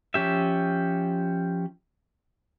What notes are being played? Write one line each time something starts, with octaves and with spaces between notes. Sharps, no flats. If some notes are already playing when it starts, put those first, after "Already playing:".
F3 C#4 G4 E5